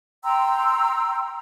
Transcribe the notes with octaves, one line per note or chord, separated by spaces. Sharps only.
G5 A#5 C6 E6